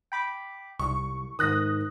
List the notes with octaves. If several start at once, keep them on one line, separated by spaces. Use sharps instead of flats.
G5 B5 D6
C2 C#6
G#2 D#3 D#6 F#6 A#6